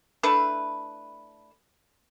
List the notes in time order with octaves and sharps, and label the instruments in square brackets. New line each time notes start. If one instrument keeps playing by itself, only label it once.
[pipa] A3 D4 E4 B4